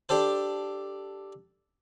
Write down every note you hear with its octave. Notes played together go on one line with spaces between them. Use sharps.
D4 G4 A4 C5